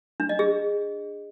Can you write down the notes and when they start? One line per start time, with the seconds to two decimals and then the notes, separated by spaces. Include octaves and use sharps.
0.20 D4
0.29 D#5
0.39 G#4